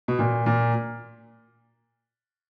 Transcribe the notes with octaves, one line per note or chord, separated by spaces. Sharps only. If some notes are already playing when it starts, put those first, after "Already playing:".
B2
A#2
A#2